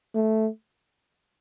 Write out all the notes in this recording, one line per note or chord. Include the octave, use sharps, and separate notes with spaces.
A3